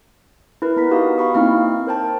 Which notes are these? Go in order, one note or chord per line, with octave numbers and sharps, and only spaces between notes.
E4 A#4 B4
B3 A#5 B6
D#4 F#4 G4 B4 F5 D#6
F5 B5 C#6 D#6
A#3 C4 D#4 E4 F5 F6
A#4 C5 G5 A5